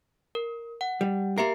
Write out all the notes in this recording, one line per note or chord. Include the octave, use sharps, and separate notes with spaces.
A#4
F#5
G3
A#3 G4 A#4 E5 C7